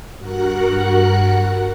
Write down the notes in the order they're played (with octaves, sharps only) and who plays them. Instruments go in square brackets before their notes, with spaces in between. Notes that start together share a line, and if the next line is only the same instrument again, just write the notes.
[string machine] G2 F#4 A#4 F#5 F#6